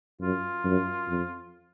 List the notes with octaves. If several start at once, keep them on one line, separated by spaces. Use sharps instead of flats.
F#2 F4
F#2
F2